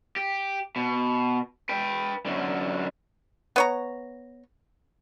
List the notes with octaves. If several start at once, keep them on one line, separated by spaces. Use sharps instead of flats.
G4
B2
B4 G5
F#2 D3
B3 C#5 A#5